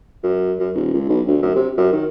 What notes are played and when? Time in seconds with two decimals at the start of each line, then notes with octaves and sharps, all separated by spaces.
0.23 F#2
0.59 F#2
0.75 D#1
0.94 C#2
1.09 B1
1.27 D2
1.42 F#2
1.55 C3
1.77 F#2
1.92 D#3